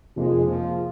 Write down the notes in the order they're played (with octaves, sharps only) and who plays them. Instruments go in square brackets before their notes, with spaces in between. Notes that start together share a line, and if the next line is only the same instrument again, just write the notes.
[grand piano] F1 F2 F3 A#3 [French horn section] G#3
[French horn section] F3